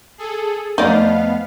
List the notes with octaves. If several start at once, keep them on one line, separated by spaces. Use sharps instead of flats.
G#4 A4
F2 A3 B3 D#4 D5 D#5 F5